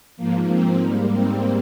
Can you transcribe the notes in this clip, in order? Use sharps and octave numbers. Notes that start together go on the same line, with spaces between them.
G#2 F3 A#3
C4
G#2 G3 A#3
C4